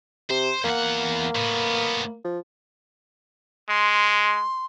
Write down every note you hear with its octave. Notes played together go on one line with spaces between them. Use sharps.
C3 C5
E2 A#3 F#5
A2 B3
F3
G#3 C6